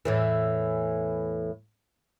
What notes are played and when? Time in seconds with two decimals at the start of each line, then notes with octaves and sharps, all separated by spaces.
0.05 E2 A2 E3